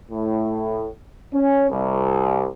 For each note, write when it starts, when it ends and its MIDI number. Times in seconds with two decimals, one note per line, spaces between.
0.11 0.87 45
1.34 1.68 61
1.71 2.48 36